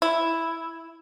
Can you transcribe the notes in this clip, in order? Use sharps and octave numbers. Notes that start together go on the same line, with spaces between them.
E4